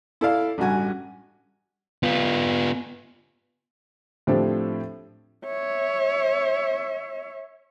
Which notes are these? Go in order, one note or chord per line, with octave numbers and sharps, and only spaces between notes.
E4 A4 D5 F5
A1 G2 F#4 G#5
B3 F4
A2 F3 C4 D4 G4 A4
C#5 E5